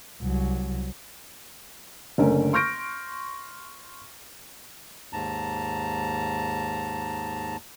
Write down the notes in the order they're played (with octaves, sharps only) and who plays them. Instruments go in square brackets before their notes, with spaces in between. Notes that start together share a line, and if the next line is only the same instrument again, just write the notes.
[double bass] C2 F#3
[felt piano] F#1 D3 A3 C#4 A#4
C6 C#6 F6 G6 A#6 D7
[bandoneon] D#2 G#2 A5 A#5